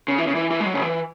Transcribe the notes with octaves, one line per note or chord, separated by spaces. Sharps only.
C#3
E3
C#3
E3
E3
G#3
F#3
C#3
E3